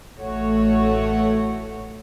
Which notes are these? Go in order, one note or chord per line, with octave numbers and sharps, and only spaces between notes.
A1 A3 F#4 C#5